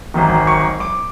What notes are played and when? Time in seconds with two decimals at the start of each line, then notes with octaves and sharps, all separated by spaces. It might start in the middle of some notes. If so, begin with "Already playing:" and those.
0.14 G#1 F#2 D#3
0.47 C#6
0.80 D6